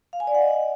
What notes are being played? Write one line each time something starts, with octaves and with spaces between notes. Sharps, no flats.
F5
G#5
D5
F#5
D#5